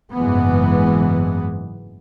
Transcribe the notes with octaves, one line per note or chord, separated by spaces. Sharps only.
F#1 G#2 E3 G#3 B3